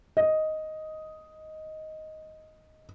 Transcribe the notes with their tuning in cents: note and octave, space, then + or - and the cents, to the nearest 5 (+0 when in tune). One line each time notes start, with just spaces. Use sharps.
D#5 +5